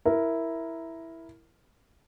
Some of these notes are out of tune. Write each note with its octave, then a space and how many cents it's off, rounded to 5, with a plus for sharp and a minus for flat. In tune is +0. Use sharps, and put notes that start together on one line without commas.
E4 +0 A#4 +0